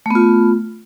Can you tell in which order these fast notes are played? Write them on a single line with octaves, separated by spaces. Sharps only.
A3 B3 F4